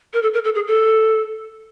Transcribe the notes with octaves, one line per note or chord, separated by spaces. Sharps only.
A#4
A4
A#4
A4
G#4
A4